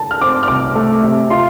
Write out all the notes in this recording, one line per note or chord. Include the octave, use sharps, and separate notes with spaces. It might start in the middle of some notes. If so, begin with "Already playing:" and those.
Already playing: A5
F6
C4 D6
F6
C2 D6
A3
C3
F4 C6